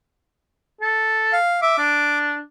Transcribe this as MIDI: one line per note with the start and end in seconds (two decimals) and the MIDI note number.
0.81 1.35 69
1.33 1.60 77
1.62 1.74 76
1.62 2.19 86
1.78 2.41 62